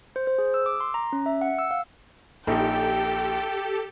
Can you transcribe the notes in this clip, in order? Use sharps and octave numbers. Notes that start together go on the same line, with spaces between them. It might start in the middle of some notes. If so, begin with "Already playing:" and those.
C5
C5
G#4
E6
D6
C6
A#5
C#4
E5
F#5
E6
F5
A#1 D#4 G4 A4 G5